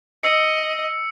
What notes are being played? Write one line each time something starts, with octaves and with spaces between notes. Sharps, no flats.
D#5 E6 C7 C#7